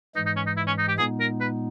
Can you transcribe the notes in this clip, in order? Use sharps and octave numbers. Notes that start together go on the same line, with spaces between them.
G#2 E3 G#3 D#4
D#4
C#4
D#4
E4
C#4
D#4
G4
A#2 G#3 B3 D#4 G#4
A#4
B4